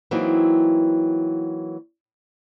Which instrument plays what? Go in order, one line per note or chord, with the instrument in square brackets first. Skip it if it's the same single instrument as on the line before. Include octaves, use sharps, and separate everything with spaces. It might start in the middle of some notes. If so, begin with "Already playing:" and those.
[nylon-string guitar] E3 F#3 A#3 C4 D#4 E4